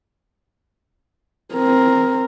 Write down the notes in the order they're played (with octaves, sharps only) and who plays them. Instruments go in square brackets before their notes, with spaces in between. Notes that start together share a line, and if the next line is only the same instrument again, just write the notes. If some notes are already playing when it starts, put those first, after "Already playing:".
[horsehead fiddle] C4 A#4